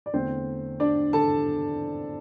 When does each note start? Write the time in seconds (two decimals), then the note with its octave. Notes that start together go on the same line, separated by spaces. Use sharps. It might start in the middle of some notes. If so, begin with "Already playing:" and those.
0.06 D5
0.13 E2 D3 A3 C4 C5
0.80 D4 D5
1.13 A4 A5